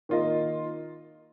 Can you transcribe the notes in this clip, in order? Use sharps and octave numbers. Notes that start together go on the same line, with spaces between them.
D#3 A#3 F4 A#4 D#5